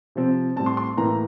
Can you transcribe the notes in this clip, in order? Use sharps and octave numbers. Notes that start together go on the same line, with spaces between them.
C3 F3 C4
A2 G3 C4 A5
C6
C6
A2 E3 A#3 A#5